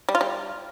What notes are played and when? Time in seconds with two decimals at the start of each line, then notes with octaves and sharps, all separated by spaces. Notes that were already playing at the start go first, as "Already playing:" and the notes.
0.09 G3
0.15 F4
0.21 G3